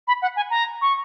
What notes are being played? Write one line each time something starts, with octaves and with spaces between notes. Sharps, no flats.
B5
F#5
G#5
A#5
C#6